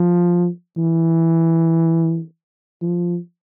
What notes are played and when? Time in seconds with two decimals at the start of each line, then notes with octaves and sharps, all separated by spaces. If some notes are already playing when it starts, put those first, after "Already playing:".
Already playing: F3
0.77 E3
2.82 F3